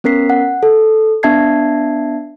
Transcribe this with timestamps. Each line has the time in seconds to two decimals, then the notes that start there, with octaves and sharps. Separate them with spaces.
0.04 B3 C#4 A#4 B6 C7
0.30 F#5
0.63 A4
1.23 B3 D4 E5 A5 G#6 C7